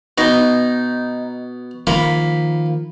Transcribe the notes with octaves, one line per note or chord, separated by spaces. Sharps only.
B2 D#4
D#3 F3 A#3 B5